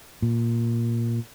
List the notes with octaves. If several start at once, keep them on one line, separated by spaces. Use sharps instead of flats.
A#2